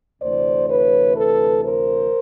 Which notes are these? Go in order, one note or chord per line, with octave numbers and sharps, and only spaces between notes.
D2 C3 E3 A3 C5 D5
B4 C#5
A4 B4
A#4 C5